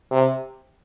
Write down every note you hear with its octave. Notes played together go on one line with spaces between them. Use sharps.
C3